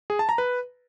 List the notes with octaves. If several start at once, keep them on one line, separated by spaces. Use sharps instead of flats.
G#4
A5
A#5
B4